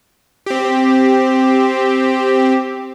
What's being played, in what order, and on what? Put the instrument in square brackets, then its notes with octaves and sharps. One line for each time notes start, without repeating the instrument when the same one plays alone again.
[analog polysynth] C4 G4